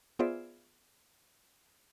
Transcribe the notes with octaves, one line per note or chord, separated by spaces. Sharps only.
B3 F4 G#4 C5 D5 E5